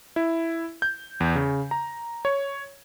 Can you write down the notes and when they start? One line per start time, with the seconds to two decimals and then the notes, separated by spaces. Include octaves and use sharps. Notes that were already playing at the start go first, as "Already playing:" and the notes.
0.16 E4
0.82 G6
1.20 E2
1.35 C#3
1.71 A#5
2.25 C#5